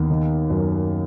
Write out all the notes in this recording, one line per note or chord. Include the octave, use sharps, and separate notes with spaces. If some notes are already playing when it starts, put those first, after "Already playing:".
Already playing: D#2 B3
D#3
F#2